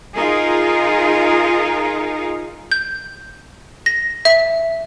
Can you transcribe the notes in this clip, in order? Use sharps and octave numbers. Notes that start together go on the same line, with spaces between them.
D#4 F4 G#4 A#4
G6
A#6
E5